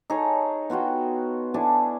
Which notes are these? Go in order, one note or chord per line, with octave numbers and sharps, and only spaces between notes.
D#4 G#4 A4 C#5
B3 F4 F#4 G5
D4 E4 G#4 A4